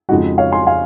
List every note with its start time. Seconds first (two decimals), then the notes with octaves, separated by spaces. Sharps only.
0.09 F2 C#3 G#3 D#4 F#4
0.38 C#5 F5
0.52 G#5 C6
0.66 F5 G#5